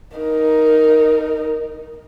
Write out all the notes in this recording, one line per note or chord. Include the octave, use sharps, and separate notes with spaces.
D#4 A#4